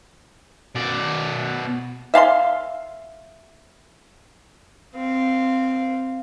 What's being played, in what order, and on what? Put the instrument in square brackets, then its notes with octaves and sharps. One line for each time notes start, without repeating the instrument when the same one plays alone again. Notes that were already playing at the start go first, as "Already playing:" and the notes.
[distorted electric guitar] B2 D5
[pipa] E5 F5 A5 C6
[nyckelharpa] C4 F5